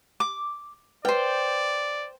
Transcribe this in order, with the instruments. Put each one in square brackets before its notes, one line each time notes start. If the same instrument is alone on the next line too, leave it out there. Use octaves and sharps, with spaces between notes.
[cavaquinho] D6
[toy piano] B4 [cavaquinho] C5 G5 [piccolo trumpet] D5